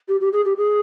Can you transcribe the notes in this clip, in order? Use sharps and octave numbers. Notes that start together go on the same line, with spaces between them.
G4
G4
G#4
G4
G#4